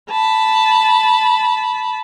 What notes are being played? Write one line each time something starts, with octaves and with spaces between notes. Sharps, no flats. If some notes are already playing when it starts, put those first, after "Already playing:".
A5 B5